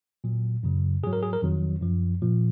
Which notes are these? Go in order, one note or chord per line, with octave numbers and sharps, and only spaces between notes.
A#2 F#3
F#2 C#3 F#3
G#2 F#3 G#4
A#4
G#4
A#4
F2 D#3 F#3
F#2 F3
A#2 F3